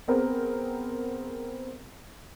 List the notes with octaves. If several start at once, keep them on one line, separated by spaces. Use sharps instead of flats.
B3 C4 G#4 A#4